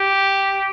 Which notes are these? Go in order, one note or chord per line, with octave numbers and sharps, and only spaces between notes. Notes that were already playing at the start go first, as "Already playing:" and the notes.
Already playing: G4